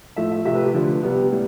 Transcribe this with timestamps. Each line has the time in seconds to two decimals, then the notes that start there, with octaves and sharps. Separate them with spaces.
0.16 A2 F3 A3 E5
0.32 E5
0.45 C3 F3 A3 E5
0.55 B4
0.64 G4
0.74 D3 F3 A3 B4
1.03 C3 G3 B3
1.31 A2 G3